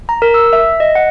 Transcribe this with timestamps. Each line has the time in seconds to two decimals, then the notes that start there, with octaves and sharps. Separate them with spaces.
0.09 A#5
0.22 A#4
0.34 E6
0.53 E5
0.80 D#5
0.95 F#5